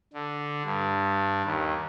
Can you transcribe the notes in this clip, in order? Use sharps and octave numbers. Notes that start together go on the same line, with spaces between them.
D3
G2
D#2